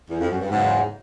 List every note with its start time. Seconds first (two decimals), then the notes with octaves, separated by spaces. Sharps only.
0.10 E2
0.19 F2
0.30 F#2
0.40 G2
0.50 E2 G#2 C#3 F#3 B3